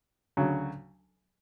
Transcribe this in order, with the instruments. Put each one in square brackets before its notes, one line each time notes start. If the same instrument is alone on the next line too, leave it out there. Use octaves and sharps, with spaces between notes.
[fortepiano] D2 C#3 F#3